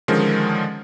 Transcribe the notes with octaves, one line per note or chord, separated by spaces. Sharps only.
D3 D#3 F3 G#3 C#4 A#4